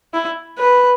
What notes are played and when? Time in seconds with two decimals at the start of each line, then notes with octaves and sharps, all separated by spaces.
0.14 E4
0.59 B4